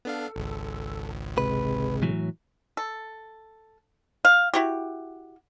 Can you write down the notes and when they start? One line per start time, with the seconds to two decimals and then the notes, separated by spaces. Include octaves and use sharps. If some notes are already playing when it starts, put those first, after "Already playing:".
0.05 B3 D4 A4 F5
0.36 G#1 C#2
1.38 C3 G#3 B4
2.02 A2 E3 F#3
2.77 A4
4.25 F5
4.54 E4 F#4 G4